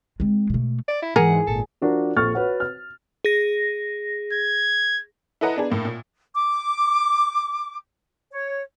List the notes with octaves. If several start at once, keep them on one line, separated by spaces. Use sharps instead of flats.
G#3 C4
B2 A3
D5
E4
G#2 E3 G#3 G#4 A#4 F#5
G#1 A#2 A4
F3 D4 F#4 A#4
A#1 A4 C#6 F6 A6
F#4 B4 C#5 F#5
F6
G#4 A#6
G#6
E4 A4 B4 D#5 F#5 A#5
B3 D4 G#4
A2 A#3
A#2
D6
C#5